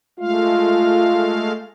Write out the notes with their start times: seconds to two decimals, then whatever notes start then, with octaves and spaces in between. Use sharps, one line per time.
0.19 G#3 A3 F4 F5